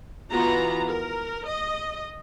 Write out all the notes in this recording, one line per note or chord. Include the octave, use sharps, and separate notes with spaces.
E3 B3 F4 F#4 A#5
A#4
D#5